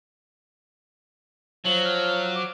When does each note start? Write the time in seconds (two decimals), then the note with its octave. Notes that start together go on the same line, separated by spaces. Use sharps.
1.65 F3 F#3 F#7
1.85 F6
2.35 D6